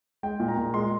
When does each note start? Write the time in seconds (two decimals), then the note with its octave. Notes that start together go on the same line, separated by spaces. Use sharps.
0.23 G#3 G5
0.40 A#2
0.48 A#5
0.57 A#2
0.74 G#3 C6